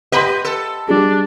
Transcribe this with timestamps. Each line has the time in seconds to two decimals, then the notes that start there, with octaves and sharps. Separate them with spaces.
0.12 G4 B4 D#5 F#5 B5 C6
0.44 A4
0.88 G3 D4 G#4